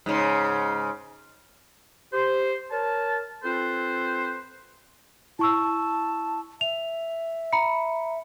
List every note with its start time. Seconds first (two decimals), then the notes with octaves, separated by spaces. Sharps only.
0.06 G#2 C#3
2.13 G4 C5
2.71 A#4 C#5 A5
3.44 C4 F4 A4 B4 C5
5.39 E4 A5 C#6 E6
6.61 E5 F7
7.52 A#5 B5 C#7